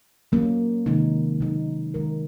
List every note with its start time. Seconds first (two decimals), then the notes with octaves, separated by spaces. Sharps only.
0.32 F#3 A#3 C#4
0.86 C3 D#3 G#3 D#4
1.40 C#3 F#3 A#3 D#4
1.94 D#3 G#3 D#4 A#4